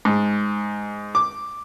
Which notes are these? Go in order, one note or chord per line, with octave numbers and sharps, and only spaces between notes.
G#2
D6